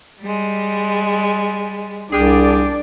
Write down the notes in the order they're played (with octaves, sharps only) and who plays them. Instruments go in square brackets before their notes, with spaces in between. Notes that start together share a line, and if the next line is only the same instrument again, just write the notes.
[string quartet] G3 G#3
[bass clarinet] C2 [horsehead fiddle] D4 D5 [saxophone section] G4 G#4